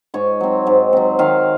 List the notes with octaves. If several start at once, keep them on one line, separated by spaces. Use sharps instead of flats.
G#2 C#5
F#3 C4
G#2
F#3 C4
D#3 F5